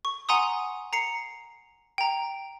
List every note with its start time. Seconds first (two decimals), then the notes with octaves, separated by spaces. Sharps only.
0.05 C#6
0.29 F#5 G#5 A#5 C6 D#6
0.93 A#5 C7 C#7
1.98 G5 A#5